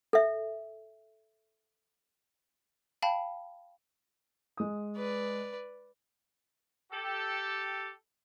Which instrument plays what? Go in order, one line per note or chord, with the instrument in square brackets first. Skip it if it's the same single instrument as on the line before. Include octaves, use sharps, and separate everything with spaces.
[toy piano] A4 E5
[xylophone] F5 G5 A5 B5
[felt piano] G#3 D#6
[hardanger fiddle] B4 D5
[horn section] G4 A4